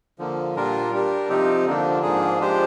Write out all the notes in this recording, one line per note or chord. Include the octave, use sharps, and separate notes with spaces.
D3 F3 A#3
A#2 G3 D4 F4 A#4
G3 D4 G4 A#4
C3 F3 C4 D#4 G4
D3 F3 A#3 D4
G#2 F3 A#3 D4 G#4
F3 G#3 D4 G4 C5